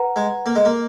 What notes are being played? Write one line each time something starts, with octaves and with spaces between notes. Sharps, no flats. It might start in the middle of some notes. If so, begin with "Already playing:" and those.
Already playing: B4 F#5 A#5
G#3
A#3
G#3
A#3